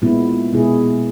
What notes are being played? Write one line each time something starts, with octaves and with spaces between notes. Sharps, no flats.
A#2 G#3 B3 E4
B2 G#3 B3 E4 G#4